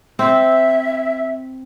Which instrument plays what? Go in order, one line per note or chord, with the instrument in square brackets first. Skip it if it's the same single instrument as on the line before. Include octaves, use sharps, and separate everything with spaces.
[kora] C4 [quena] E5